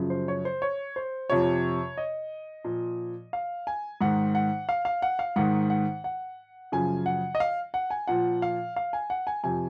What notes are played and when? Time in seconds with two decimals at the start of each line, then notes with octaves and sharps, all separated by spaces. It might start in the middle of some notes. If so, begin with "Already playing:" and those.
Already playing: F#2 C#3 F3
0.10 C5
0.28 C#5
0.45 C5
0.62 C#5
0.96 C5
1.30 F2 C3 F3 C#5
1.98 D#5
2.65 A#2 F3
3.33 F5
3.67 G#5
4.01 G#2 D#3 F#5
4.35 F#5
4.69 F5
4.85 F5
5.02 F#5
5.19 F5
5.36 G#2 D#3 F#5
5.70 F#5
6.04 F#5
6.72 F#2 C#3 F3 G#5
7.06 F#5
7.35 D#5
7.40 F5
7.74 F#5
7.90 G#5
8.07 A#2 F3 F#5
8.42 F5
8.76 F5
8.93 G#5
9.10 F#5
9.27 G#5
9.44 F2 C3 F3 G#5